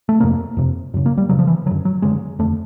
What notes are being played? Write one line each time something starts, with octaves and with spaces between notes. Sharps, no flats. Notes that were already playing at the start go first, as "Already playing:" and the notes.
A3
F2 C3 A#3
F2 C3
F#2 C#3
A#3
G3
F#2 C#3 F#3
F3
E3
D3 F#3
F#2
F#3
F#2 D3 G#3
F2 D3 A3